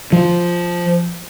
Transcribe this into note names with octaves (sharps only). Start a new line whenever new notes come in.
F3